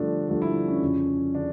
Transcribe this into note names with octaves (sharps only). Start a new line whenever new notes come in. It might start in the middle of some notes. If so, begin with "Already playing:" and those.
Already playing: G2 D3 F3 A3 D4
G2 D3 F3 A3
E4
C#4
F2 C#3 F3
C#3 D4